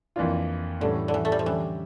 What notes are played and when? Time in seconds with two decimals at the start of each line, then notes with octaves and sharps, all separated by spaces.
0.16 F2 E3 A#3 D4 F4
0.81 A2 D3 E3 G3 C#4
1.08 D3
1.14 E3
1.25 A3
1.32 G3
1.39 F3
1.46 D3 E3 G3 C#4 G4